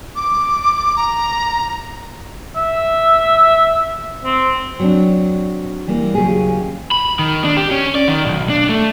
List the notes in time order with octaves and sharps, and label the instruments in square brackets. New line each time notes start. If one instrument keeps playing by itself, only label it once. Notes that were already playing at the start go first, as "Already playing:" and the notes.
[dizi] D6
A#5
[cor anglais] E5
C4
[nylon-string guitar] F#3 C4 D4
E3 G3 A#3
D#2 C#3 F#3 G4 G#4
[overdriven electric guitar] B5
D#3
D4
G4
C#4
D5
D#3
B1
D4
A3